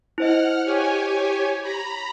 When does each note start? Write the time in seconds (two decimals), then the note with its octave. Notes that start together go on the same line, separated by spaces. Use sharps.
0.18 E4 C5 D#5 F#5 F6
0.65 G4 C#5 G#5
1.61 A#5 B5